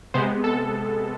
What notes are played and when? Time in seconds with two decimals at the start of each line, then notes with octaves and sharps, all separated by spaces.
0.14 C3 G#3 B3 C5
0.44 A4